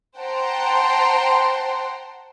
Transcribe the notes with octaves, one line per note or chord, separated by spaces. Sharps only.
C5 F#5 G5 A5 A#5 C6